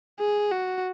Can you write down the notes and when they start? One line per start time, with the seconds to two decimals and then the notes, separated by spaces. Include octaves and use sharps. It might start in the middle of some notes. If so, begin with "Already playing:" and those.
0.19 G#4
0.51 F#4